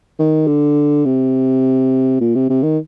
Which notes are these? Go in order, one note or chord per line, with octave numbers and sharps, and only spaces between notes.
D#3
D3
C3
A#2
C3
C3
D#3